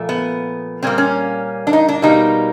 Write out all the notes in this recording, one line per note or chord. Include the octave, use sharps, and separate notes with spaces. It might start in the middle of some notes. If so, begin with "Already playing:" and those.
Already playing: A#2 F3 A3
B3
A#2 G3 A#3 C4
C#4
D4
D#4
D4
B2 G3 A#3 D#4